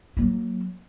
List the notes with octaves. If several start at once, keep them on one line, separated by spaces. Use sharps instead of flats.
F#3 A#3